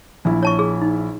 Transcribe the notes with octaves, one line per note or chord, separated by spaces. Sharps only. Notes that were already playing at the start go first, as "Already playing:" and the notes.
A#1 E4
C#5 A5 C#6
G#4
D#4